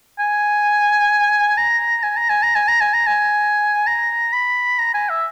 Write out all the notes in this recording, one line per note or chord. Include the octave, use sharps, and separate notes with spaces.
G#5
A#5
G#5
A#5
G#5
A#5
G#5
A#5
G#5
A#5
G#5
A#5
B5
A#5
G#5
E5